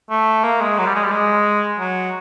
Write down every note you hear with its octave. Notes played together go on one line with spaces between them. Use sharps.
A3
A#3
G#3
F#3
G3
G#3
G3
G#3
F#3